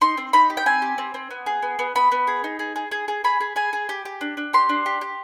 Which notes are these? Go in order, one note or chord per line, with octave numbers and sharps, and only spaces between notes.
D#4 C6
C4
D#4 B5
G4
G5
C4 G#5
G4
C4
C4
B3
G#4
B3
B3
B3 B5
B3
G#4
D#4
G#4
G#4
G#4
G#4
G#4 B5
G#4
G#4 G#5
G#4
G4
G4
D4
D4
G4 C6
D4
G4
G4